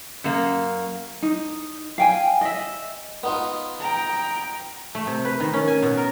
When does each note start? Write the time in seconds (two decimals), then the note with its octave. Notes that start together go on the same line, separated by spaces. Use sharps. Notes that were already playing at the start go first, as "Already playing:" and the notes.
0.24 F#2 A#3
1.22 D#4
1.98 F5 G5 G#5
2.41 D#5 E5
3.23 B3 D#4 F4
3.80 G5 A#5
4.95 A3
5.07 C3
5.25 B4
5.40 D#3
5.53 C#4
5.67 G#5
5.82 B2
5.97 A#4